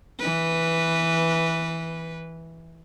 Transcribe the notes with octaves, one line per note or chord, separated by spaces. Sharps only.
E3 B4